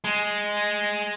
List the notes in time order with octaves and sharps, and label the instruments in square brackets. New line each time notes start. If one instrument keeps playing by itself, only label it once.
[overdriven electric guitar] G#3